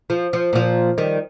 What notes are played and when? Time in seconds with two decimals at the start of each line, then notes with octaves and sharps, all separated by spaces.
0.10 F3
0.33 F3
0.53 A#2 F3
0.98 D#3 G3